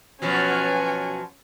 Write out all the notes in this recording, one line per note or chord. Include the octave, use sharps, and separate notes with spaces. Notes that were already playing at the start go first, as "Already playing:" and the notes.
B2 F3 F#3 C#4 G#5